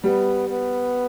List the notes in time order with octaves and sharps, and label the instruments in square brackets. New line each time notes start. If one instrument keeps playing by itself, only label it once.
[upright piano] G3 [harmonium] B3
[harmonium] B3